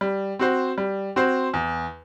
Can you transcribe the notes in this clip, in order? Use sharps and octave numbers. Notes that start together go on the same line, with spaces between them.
G3
C4 F#4 C5
G3
C4 F#4 C5
E2